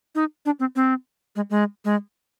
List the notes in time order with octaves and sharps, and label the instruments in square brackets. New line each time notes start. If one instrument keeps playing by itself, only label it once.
[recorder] D#4
D4
C4
C4
G#3
G#3
G#3